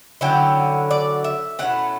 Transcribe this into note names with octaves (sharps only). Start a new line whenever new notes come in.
D3 F#3 C#4 E4 G5
D5
E5
B2 A3 C#4 E4 F#5